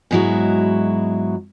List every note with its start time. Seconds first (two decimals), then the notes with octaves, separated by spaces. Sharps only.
0.11 G#2 B2 F#3 G#3 E4 F#4